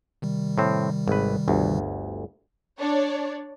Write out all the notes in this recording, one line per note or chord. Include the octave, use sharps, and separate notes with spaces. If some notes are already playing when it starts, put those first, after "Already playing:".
C3 D#3 G3
A2 C4
G#1 B4
G1 D2
D4 C#5 D5